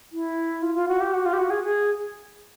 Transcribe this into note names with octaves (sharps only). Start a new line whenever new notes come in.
E4
F4
F4
F#4
G4
F#4
F4
G4
F#4
G#4
G#4